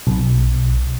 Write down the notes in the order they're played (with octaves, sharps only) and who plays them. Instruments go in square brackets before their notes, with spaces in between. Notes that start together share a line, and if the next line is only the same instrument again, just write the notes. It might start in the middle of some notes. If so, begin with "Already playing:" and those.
[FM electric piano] B1